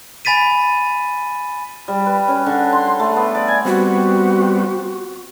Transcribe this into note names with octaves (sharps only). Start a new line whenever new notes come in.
G#5 B5 A6 B6 D#7
G3
B4
C#4
D3
C6
C6
A3
B3
D5
G#5
G3 B3 C4 F#4